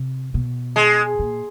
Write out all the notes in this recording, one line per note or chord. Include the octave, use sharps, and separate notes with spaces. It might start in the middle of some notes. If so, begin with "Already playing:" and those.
Already playing: C3
B2
G#3
A#2